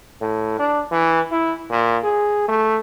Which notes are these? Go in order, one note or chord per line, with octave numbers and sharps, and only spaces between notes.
A2
D4
E3
E4
A#2
G#4
A3